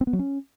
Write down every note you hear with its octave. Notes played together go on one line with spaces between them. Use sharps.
C4
B3
F#3
C#4